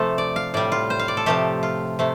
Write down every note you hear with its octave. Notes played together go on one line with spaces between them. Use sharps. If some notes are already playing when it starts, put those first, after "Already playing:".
Already playing: C3 F3 A3 A4
D5
F5
A2 G3 D5
F4
C5
F5
D5
A4
C3 F3 A3 G4
F4
C3 A3